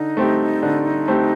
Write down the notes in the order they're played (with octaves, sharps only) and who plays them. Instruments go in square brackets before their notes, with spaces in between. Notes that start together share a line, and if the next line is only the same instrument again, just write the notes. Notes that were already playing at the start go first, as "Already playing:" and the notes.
Already playing: [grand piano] D3 [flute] D#4
[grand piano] A3 C4 G4
D3
A3 C4 G4